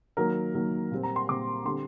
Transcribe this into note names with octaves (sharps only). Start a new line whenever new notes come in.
D#3 F#3 A#3 A#4
D#3 F#3 A#3
A#2 G3 C4
A#5
C6
A#2 G3 C4 D6
D3 G3 C4 C6